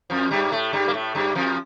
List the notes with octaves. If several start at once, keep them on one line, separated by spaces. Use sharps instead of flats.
F2 F3
G2 G3
A2 A3
G2 G3
A#3
A2 A3
G2 G3
F2 F3